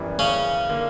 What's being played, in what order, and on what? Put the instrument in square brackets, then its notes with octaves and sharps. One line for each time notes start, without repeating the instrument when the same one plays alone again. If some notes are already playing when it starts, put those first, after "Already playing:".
Already playing: [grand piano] F#2 E3 G3 B3 D4
[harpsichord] C#3 C#4
[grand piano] D3 A#3